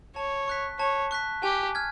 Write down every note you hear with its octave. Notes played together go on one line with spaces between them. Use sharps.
C#5 A5
C#6 F#6 B6
C#5 A5
C#6 F#6 B6
G4 G#5
F6 G#6